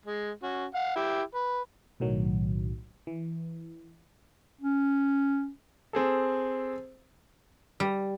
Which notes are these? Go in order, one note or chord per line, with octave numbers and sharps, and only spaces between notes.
G#3
C#4 F#4
F5 F#5
E4 G4
B4
B1 A2 D#3 F#3
E3
C#4
C4 G#4 A4
G3